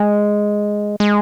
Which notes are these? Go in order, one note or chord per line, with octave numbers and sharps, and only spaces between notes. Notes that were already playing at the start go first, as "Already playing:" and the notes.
Already playing: G#3
G#3